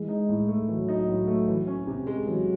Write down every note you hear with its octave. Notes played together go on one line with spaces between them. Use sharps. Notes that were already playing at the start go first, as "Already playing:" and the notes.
Already playing: E3 G#3
D#4
A2
A3
E3 F#3
D#4
A2
A3
E3
C#4
C3
G#3
E3 F#3